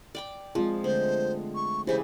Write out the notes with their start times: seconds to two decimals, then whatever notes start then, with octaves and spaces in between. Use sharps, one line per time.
0.15 D5 G5 D6
0.55 F3 G#3 C4 G#4
0.84 D3 A3 C5
1.55 C#6
1.87 C#3 E3 E4 G4 G#4 C5 E5